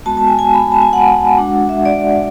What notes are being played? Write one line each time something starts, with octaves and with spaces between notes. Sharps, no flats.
G#3 B3 F#4 A5
A5
G#5
G#5
B5
A5
G#5
F#5
G#3 D4 F#4
E5
D5